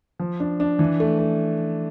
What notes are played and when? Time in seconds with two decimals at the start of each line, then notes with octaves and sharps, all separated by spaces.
0.19 F3
0.40 D4
0.60 D4
0.79 E3
1.00 A3
1.19 A3